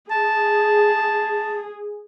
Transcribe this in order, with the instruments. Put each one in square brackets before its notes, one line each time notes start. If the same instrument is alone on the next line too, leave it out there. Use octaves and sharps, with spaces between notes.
[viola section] G#4 [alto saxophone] A5